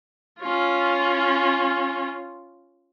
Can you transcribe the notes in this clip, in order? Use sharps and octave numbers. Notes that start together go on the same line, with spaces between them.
C#4 F4